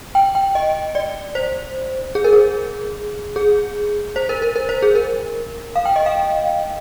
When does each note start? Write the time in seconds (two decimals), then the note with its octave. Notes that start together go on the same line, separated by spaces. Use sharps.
0.15 G5
0.35 G5
0.55 D#5
0.95 D5
1.35 C5
2.15 G#4
2.24 A#4
2.33 G#4
3.36 G#4
4.16 C5
4.29 A#4
4.42 A#4
4.56 A#4
4.69 C5
4.82 G#4
4.95 A#4
5.76 F5
5.85 G5
5.96 D#5
6.06 F5